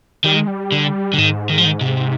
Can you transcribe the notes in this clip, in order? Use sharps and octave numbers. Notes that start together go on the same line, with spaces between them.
D#3 G3
G#3
G3
D3
D3
G#2 D#3
D#3
F3
D#3
C3